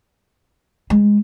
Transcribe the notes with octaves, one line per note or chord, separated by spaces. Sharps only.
G#3